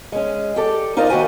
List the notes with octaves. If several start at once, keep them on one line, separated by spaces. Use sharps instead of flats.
G#3 C#4
G4 A4 D5
D#4 F4 A#4 C5 D5 D#5
D#2 A#2 F#4 G4 G#5